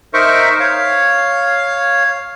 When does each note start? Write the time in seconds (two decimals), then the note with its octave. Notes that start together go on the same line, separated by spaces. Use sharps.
0.14 D#4 A#4 C5 E5 C#6
0.60 C#5 F5